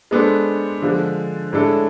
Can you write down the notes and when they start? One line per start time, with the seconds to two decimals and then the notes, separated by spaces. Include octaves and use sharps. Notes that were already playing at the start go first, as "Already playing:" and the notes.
0.11 G#3 B3 D4 A4 C5
0.82 D3 F3 G#3
1.53 A2 G#3 D4 A4